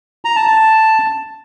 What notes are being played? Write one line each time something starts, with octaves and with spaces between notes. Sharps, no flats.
A#5
A5
A5